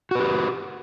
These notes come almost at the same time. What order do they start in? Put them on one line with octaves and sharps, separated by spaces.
F#4 B4 G4